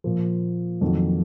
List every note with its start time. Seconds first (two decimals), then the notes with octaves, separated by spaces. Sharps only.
0.04 A#2 F3 A#3
0.81 F2 D#3 F#3 A#3